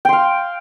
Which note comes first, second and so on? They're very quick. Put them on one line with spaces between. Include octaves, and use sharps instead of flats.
G5 C6 F5